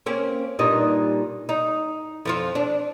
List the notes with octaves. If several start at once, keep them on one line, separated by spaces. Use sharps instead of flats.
A#3 C4 C#4
G2 A#2 D#4
D#4
F2 F3 F4
D4